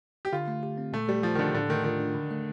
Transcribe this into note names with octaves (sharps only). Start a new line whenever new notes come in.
G4
D3 F4
A3
G4
C4
A#2 A3
G3 A3
F3 G4
D#3
D3 D4
A2 D3
D#3 A3
D#3 F4
D4
D3
A3